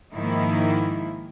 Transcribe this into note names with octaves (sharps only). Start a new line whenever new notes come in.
G#2 D#3 F3 A#3 E4